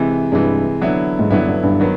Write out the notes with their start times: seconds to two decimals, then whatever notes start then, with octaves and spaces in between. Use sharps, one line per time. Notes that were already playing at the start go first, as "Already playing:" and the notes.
Already playing: C3 E3 G#3
0.32 G2 C3 E3 G#3
0.81 D3 F#3 B3 E4
1.19 G#2
1.30 G2 D3 F#3 B3 E4
1.47 G2
1.63 G2
1.80 D#3 F#3 B3